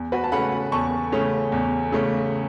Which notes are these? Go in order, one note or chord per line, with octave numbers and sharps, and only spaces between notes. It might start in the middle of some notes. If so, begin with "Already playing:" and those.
Already playing: E2
F#4 B4
A5
C#3 A3 C#4 F#5 B5
E2 A5 C#6
C#3 A3 C#4
E2
C#3 A3 C#4